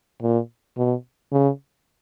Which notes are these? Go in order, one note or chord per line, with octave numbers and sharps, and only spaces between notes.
A#2
B2
C#3